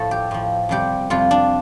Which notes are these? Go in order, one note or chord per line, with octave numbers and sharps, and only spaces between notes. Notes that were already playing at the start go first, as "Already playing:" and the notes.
Already playing: A2 F3 A4
G4
A2 F3
F2 C3 G3 G4
F2 C3 G3 F4
D4